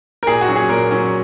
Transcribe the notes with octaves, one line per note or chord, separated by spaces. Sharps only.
A#4
A#2 G#4
F#4
F#3 C#4
G#4
A#2 A#4
F#3 C#4